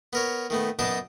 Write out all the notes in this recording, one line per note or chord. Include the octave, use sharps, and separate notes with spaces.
B3 A#4 C#5
D#3 A3 B3
F#2 B3 D4 D#4 A5 D6